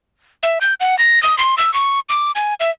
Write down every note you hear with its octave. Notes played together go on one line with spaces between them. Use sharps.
E5
G6
F#5
A#6
D#6
C6
E6
C#6
D6
G#5
E5